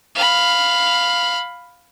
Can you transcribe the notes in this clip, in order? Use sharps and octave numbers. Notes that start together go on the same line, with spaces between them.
F5 B5